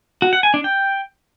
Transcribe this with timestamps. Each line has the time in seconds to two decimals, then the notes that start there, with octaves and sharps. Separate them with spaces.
0.22 F#4
0.33 F#5
0.43 G#5
0.54 D4
0.64 G5